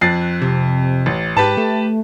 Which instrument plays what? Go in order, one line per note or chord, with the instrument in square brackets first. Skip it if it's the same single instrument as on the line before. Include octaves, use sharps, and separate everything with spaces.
[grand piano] F2 A6 C7 [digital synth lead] F#6
[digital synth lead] C3
[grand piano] A1
[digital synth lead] G#2 [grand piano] G4 B4 A5
[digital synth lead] A3